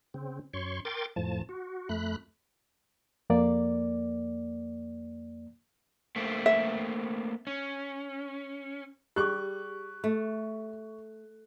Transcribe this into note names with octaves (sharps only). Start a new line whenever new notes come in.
C#3 C4
F#2 C#5 C6 C#6
A#4 G5 C6 D6 A6
F2 A2 F3 A5
F#4
F2 A3 B5 F#6
F2 A#3 D5
A3 A#3 C4
E5
C#4
G3 G4 G#4 C#6 D6 F#6
A3